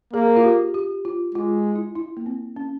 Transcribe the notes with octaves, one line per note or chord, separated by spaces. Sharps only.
A#3 G#4
F4
G4
G4
F4
G#3 F4
E4
E4
A#3
C4
C#4